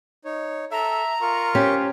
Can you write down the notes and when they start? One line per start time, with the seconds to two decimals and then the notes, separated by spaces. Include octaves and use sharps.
0.25 D#4 C#5
0.72 A4 E5 A#5
1.22 F4 A#4 C#6
1.55 C#4 G4 C5